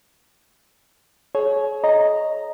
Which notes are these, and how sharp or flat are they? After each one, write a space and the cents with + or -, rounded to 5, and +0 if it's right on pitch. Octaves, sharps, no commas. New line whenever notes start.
G#4 +45 C#5 +0
D#5 +0 A#5 +0